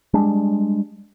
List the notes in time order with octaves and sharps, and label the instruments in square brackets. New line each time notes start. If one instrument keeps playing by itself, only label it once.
[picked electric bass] G3 G#3 D4